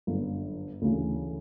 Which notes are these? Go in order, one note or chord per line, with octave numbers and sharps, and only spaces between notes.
G1 F#2 D3
D2 C#3 E3